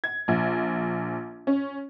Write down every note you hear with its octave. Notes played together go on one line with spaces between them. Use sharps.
G#6
A#1
C#4